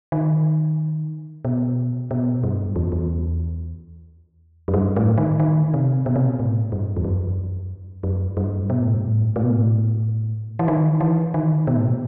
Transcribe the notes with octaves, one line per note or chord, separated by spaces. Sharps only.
D#3
B2
B2
G2
E2
E2
F#2
G2
A2
D#3
D#3
C3
B2
C3
B2
A2
G2
E2
F#2
F#2
G2
B2
A2
G2
A2
A2
B2
A2
E3
D#3
E3
D#3
B2
A2
B2